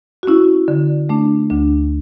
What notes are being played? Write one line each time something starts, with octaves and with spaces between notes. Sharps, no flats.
F#4
C#4 E4
D3
A3 D4
D2 D4